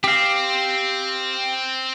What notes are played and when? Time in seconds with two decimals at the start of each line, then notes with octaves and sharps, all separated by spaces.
0.04 C4 G4 F5